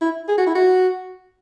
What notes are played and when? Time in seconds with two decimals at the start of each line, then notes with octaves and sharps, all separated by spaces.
0.01 E4
0.28 G#4
0.38 F#4
0.47 E4
0.55 F#4